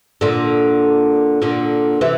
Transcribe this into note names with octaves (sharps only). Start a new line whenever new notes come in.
A#2 D3
A#2 D3
C3 E3